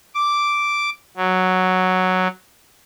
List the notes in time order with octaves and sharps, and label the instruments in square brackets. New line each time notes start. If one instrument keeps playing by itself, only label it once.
[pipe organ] D6
F#3